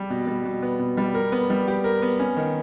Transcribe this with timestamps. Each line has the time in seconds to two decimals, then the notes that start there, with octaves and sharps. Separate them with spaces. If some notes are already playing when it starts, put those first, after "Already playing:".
Already playing: G3
0.10 B2
0.27 G3
0.45 B2
0.63 B3
0.79 B2
0.97 G3
1.14 A#4
1.32 B3
1.50 G3
1.68 G4
1.84 A#4
2.02 B3
2.20 C#4
2.37 D#3